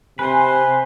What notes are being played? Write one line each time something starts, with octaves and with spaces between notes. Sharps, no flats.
C3 B4 C5 G#5